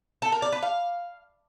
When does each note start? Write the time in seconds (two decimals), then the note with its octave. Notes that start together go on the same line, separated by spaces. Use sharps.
0.22 A4
0.32 A#4
0.42 D5
0.52 B4
0.63 F5